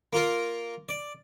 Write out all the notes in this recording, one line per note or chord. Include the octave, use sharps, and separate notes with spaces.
A#3 F4 A#4
D5